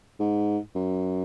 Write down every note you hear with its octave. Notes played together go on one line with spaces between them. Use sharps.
G#2
F#2